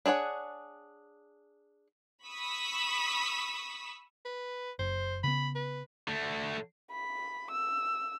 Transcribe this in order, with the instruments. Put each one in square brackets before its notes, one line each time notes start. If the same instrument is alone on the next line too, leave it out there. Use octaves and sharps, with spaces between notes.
[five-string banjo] D4 G#4 C#5 F#5
[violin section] B5 C#6 D#6 E6 B6
[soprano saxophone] B4
[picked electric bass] F#1 [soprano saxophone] C5
[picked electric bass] C#3 B3 [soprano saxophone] B5
[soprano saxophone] B4
[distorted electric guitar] D3 A3
[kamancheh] B5
E6